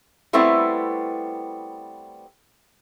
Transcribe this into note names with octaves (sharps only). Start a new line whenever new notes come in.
G3 A3 B3 C4 E4